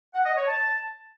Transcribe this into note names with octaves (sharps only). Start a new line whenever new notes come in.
F#5
D#5
C#5
A5